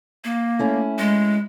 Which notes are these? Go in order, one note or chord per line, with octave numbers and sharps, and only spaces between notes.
A#3
A3 C#4 E4
G#3